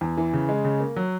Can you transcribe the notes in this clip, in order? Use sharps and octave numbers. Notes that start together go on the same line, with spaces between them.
E2
E3
C#3
G#3
C#3
A#3
F#3